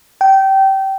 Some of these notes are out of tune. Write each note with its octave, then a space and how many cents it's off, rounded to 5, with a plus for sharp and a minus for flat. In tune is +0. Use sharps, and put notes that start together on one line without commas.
G5 -20